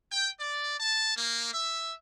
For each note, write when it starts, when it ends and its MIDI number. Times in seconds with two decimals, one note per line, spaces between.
0.11 0.30 79
0.40 0.76 74
0.80 1.12 81
1.16 1.50 58
1.53 1.93 76